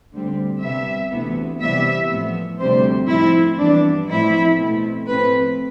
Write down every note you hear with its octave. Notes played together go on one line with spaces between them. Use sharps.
D2 D3 G3 C4
C3 G3 B3 E5
D2 C3 E3 B3
C3 E3 G3 B3 E5
A2 F3 B3
D2 C3 G3 C4 C5
A2 F3 C4 E4
G2 E3 B3 D4
A2 F3 C4 E4
B2 A3 C4
A2 F3 A3 C4 B4